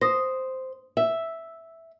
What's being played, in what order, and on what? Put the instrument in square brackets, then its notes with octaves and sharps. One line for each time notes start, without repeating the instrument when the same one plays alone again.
[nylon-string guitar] C5 [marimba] D#6 A#6
[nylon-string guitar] E5